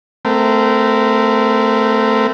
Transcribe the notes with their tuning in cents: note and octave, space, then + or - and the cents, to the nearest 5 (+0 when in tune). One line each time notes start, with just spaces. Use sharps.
A3 +0 C4 -25 A#4 -10